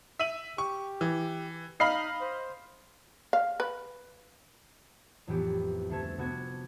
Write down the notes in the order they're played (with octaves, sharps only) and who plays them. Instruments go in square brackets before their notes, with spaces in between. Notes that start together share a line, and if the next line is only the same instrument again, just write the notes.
[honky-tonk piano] E5 D#7 F#7
[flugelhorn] G4 [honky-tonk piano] C#6
[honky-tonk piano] E3
[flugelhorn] D#4 [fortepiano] D#5 F5 B5 [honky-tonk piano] F6 C7
[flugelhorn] C5
[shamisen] F5
B4
[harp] A1 F2 E3 B3 G4
D2 A3 A5 G#6
C3 B3 F#4 G#6